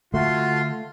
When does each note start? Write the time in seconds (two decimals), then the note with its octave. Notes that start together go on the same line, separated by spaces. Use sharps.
0.14 D3 A3 F4 F#4 C6